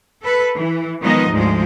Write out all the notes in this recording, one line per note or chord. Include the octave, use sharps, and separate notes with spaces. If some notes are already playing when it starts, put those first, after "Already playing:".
A4 B4
E3
D#3 F3 G#3 B3 D#4 D#5
D2 G#2 F3 G#3 C5